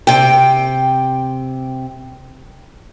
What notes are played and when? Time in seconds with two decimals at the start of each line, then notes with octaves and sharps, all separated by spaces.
0.07 C3 G5